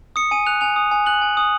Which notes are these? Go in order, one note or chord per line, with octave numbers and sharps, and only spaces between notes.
D#6 C#7
G#5 D#7
F#6 F7
G#5 F7
D#6
G#5
F#6 F#7
G#5
D#6